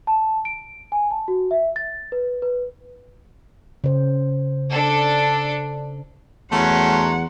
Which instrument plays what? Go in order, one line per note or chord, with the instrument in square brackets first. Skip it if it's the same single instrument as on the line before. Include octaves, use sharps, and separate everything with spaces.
[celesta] A5
D7
G#5
A5
F#4
E5
A6
B4
B4
[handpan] C#3 C5
[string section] D4 A4
[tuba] E2 [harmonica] F#3 C#4 C6 [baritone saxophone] A3 [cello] F#5